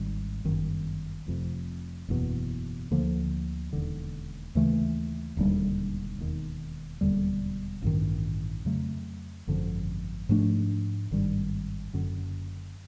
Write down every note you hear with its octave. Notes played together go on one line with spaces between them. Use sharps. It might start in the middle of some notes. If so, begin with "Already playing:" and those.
Already playing: G#1 G#2 D#3 G3
G1 F#2 D#3
F1 F2 C3
F#1 E2 B2
D2 D3 F3 A#3
E1 D#2 D3
D#2 C#3 E3 A3
E1 D#2 D3 G3
E1 D#2 D#3
E1 D#2 D3 G3
A1 G2 D#3
F2 C#3 F#3 A3
G#1 F#2 D3 F3
G#2 F3 A3 D4
G#1 G2 D#3 G3
F#1 F#2 D3